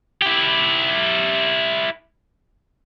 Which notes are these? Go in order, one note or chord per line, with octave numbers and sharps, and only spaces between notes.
E4 G4